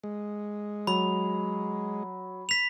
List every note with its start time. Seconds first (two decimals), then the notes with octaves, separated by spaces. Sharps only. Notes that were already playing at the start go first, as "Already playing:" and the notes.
0.04 G#3
0.87 F#3 B5
2.49 B6 F7